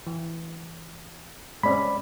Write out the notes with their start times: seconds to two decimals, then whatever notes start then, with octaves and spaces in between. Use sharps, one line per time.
0.07 E3
1.63 G#3 C4 C#4 D5 B5